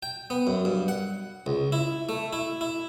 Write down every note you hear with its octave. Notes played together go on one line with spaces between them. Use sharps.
G5
B3
F#2
G2
F#5
C#2
E4
A3
E4
E4